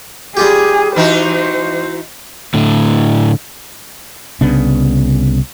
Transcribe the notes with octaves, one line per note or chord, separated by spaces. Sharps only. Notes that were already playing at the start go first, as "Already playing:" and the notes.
G3 F4 G4 G#4
E3 D#4 F#4 C5
A2 D3
C2 C#3 B3 D4